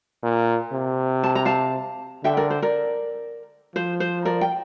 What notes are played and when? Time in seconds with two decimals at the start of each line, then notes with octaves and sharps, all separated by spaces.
0.23 A#2
0.73 C3
1.23 A5
1.35 A#5
1.45 F5 A5
2.24 D3 E5 G5
2.37 A#4 D5
2.50 C5
2.62 A#4 D5
3.76 F3 C5
4.00 C5
4.25 A#4 D5
4.41 G5